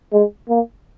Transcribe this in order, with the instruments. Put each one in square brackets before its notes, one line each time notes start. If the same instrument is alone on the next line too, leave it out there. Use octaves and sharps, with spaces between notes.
[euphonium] G#3
A#3